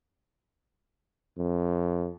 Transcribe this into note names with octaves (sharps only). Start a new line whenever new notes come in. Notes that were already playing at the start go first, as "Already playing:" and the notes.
F2